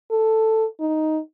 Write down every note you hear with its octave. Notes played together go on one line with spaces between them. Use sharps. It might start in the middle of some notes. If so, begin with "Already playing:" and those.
A4
D#4